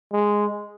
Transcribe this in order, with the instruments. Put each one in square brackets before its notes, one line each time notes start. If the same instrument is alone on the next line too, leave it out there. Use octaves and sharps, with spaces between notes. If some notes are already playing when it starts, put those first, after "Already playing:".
[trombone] G#3